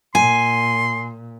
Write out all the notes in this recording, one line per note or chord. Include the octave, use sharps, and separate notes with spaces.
A#2 G#5 C6